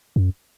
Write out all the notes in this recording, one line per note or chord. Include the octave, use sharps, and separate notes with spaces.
F#2